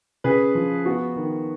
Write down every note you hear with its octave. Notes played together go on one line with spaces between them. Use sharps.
C#3 G#4 B4
F3
B3 F#4
D#3